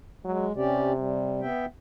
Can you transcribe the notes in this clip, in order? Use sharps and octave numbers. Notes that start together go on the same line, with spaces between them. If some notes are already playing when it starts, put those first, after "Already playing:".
F#3 G#3
C3 C#4 G4 D5
G3
B3 E5 G5